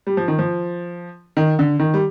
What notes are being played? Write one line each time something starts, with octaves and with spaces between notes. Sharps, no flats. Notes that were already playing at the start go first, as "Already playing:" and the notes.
G3
F3
D#3
F3
D#3
D3
D#3
G3